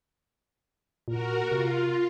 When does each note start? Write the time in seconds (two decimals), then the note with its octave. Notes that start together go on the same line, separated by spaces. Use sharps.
1.08 A#2 F#4 A#4
1.52 C3 F4